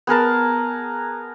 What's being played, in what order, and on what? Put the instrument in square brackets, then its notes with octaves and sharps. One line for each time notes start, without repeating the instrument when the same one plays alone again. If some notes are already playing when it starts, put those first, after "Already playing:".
[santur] B3 G#4 A#4 A5